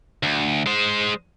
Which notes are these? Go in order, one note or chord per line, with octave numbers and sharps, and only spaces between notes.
D2
G#3 C5